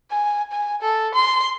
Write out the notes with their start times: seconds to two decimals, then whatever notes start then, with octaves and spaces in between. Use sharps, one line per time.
0.11 G#5
0.52 G#5
0.82 A4
1.14 C6